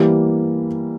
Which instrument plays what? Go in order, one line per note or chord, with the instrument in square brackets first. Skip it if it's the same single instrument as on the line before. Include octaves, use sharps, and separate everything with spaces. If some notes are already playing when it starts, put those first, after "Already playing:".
Already playing: [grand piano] E3 G3 A#3